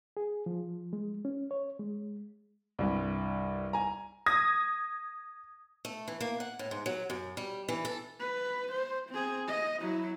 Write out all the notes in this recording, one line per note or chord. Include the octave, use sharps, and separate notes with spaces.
G#4
F3
G#3
C#4
C#5
G#3
C2 G2
G#5 A#5
D#6 G#6 A#6
A3
E3
A#3
F#5
A2
G#2
F#3
F#2
G3
E3
A4
B4
C5
C4 G#4
D#5
F#3 E4